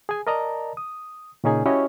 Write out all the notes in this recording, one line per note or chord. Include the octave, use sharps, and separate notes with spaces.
G#4 G#5
A#4 D5 D#5 A5 A#5
D#6
A#2 C#3 C#4 D#4 G#4 G#5
C#4 E4 F#4 G4 C#5 D#5